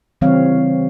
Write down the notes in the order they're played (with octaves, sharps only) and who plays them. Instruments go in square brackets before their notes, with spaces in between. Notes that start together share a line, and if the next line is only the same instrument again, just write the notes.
[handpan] C#3 E3 G3 C4 C#5 F5